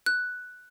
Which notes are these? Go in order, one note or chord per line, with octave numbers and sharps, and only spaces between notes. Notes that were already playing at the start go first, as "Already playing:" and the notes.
F#6